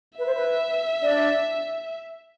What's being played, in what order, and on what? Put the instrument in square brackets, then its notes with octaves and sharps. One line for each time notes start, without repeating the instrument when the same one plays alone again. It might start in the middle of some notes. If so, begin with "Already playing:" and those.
[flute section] B4 [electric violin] E5
[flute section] C5
B4
D4 D5